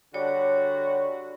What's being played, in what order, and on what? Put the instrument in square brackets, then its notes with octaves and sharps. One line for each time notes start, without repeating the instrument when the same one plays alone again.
[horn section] D3 F#4 [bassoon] G3 [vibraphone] C#5